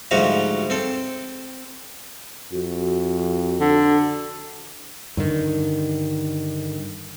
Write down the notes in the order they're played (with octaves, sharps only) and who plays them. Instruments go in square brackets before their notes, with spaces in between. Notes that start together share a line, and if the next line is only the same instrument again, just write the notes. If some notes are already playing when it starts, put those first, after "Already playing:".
[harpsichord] D2 G#2 F3 G3 F#4 A#5
C4 A4
[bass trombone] F2 [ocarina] F#4
[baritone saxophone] D3
[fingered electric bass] G2 D3 D#3